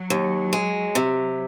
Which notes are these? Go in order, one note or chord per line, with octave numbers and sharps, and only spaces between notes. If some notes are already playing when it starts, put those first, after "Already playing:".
Already playing: F#3
D#2
G#3
C3